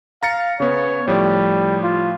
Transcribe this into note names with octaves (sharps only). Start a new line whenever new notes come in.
F5 A#5 A6 C#7
C#3 B3 C#5
A2 F3 G3
F4